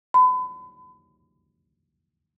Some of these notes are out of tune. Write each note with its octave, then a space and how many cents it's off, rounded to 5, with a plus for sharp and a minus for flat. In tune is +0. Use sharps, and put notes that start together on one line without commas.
B5 +35